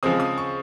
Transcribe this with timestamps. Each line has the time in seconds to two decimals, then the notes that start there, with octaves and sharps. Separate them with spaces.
0.03 C#3 F3 G#3 C4 D#6
0.20 D#6
0.38 C#6